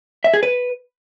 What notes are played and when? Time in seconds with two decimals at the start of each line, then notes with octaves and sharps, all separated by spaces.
0.24 E5
0.34 G#4
0.43 B4